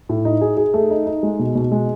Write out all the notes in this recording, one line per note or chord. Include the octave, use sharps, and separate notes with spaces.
A2
D#4
G#4
G#4
A3
D#4
D#4
G#3
B2
B2
G#3